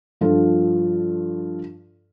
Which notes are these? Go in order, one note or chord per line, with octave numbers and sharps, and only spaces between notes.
G2 F3 F4 A4